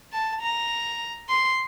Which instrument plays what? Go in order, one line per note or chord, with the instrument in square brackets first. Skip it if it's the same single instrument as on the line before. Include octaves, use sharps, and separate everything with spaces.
[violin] A5
A#5
C6